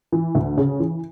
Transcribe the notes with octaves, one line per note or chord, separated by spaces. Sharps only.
E3
D2
C#3
E3